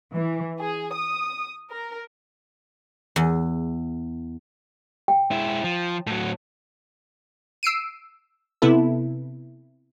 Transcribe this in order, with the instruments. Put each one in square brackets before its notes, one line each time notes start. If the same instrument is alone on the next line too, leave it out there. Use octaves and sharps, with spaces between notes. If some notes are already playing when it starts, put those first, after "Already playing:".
[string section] E3
G#4
D#6
A#4
[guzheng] E2
[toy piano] G5
[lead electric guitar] G#3 E4
F3
A2 F#3
[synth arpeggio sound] E6 C7 D7 D#7
C3 B3 E4 A4